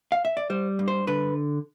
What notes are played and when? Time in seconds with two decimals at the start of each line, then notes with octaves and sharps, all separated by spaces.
0.12 F5
0.25 E5
0.37 D5
0.50 G3 C5
0.79 G2
0.88 C5
1.07 D3 B4